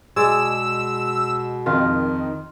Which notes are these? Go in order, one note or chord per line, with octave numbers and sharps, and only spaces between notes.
B2 G#3 G#4 D5 E6
F2 D#3 F4